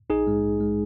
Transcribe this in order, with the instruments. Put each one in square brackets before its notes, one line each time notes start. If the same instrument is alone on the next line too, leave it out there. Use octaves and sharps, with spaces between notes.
[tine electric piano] A#1 D#4 G#4
G#2 G#3
A#1
G#3